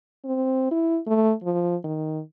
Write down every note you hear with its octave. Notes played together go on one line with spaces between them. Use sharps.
C4
E4
A3
F3
D#3